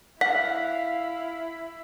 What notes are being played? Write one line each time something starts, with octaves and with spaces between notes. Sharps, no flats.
E4 F5 F#5 B6